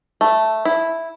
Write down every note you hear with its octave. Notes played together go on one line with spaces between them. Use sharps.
A3
E4